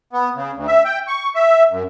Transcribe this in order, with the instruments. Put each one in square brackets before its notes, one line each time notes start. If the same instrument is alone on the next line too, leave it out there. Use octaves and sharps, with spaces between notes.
[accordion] B3
C#3
D2
E5
G5
C#6
E5
F#2